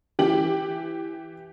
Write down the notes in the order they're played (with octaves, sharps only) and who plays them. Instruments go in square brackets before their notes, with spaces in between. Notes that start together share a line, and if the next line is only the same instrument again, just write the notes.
[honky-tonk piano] E3 G4 F#7